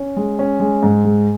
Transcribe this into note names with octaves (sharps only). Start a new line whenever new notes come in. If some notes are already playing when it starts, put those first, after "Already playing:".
Already playing: C#4
G#3
C#4
G#3
G#2
G#3